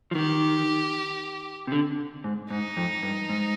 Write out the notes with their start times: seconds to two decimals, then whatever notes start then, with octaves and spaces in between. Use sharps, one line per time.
0.11 F3
0.15 D#3 G4
1.67 C3
1.72 D3
2.24 G#2
2.51 G#2 D#4
2.77 F2
3.03 G2
3.29 G#2